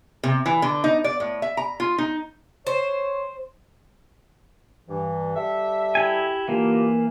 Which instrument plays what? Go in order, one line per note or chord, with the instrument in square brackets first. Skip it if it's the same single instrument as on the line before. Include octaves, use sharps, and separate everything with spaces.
[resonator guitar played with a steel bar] C3
E3
D3
D#4
D5
A2
E5
A#5
F4
D#4
[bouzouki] C5 [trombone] C#5
[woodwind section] G2 E3
G3 A4 E5
[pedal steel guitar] E4 G4 G#5
[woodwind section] D3 F4 G4 [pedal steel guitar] E3 A#3